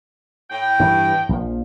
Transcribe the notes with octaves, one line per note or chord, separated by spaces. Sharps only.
A2 G5
G2 E3
A#1 F3